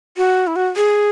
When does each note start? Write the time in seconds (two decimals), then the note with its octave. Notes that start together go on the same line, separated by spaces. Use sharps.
0.17 F#4
0.47 E4
0.56 F#4
0.76 G#4